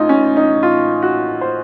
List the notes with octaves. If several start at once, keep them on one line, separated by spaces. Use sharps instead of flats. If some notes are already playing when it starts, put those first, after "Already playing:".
Already playing: A1 A2 D#4 F4
C#4
D#4
F4
F#4
C5